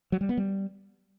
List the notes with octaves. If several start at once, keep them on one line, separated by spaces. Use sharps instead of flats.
F#3
G3
B3
G3